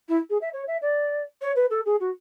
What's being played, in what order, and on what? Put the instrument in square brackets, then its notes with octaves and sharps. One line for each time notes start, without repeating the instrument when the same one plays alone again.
[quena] E4
G#4
E5
C#5
E5
D5
C#5
B4
A4
G#4
F#4